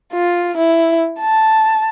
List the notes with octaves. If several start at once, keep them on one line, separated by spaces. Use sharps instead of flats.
F4
E4
A5